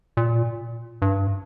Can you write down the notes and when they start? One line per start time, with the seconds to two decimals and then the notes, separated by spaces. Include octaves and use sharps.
0.17 A#2
1.02 G2